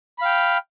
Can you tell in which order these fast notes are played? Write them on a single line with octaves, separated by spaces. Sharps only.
B5 F5 G5 F6